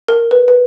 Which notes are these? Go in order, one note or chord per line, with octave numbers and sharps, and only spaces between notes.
A#4
B4
B4